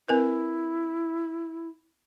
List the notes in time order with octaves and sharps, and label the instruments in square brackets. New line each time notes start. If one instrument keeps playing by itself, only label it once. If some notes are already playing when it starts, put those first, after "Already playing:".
[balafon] C4 A#4 B4 [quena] E4